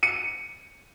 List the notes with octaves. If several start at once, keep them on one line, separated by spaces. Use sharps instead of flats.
C#7 D#7